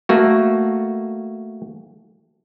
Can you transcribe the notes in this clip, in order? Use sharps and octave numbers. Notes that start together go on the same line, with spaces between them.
A3 A#3 F#4